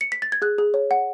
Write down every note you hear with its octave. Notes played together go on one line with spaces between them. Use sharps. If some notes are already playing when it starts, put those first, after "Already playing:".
C#7
B6
A6
G#6
G#4 F#6
G#4
C#5
F#5